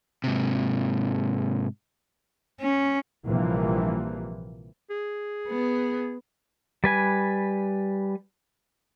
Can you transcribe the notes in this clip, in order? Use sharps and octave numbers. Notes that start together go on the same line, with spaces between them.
G#2 C3
C#4
A#1 C3 E3 F3 G3 A#3
G#4
B3
G3 B4 G#5